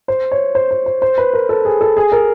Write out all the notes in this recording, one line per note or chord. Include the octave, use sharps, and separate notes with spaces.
C5
C#5
C5
C5
C5
C5
B4
A#4
A4
G#4
A4
G#4
A#4